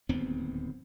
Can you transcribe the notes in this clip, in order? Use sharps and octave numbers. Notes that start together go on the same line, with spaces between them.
D1 D#2 B3 C4